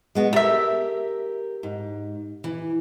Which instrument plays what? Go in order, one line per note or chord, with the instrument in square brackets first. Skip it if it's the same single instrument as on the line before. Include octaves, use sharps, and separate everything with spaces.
[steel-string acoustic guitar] G#3 B3 F#4
[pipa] A3 E5 [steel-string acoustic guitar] G4 A#4
[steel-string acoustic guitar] G#2
E3